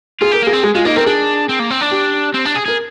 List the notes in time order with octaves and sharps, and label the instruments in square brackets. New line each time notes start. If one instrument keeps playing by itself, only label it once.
[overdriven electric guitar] F4 [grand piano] G#4
[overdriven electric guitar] G4 [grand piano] A#4
[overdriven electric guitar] A#3 [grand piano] G#4
[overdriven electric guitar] C4
[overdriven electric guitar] G#3 [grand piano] G#4
[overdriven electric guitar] G#3 [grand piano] F4
[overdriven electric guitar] A#3 [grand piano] D#4
[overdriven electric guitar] C4 [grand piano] A#4
[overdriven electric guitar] D4 [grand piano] G#4
[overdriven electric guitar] C4
A#3
C4
D4
[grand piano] G4
[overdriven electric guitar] C4
D4
G#4
[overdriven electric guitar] G#4 [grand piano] A#4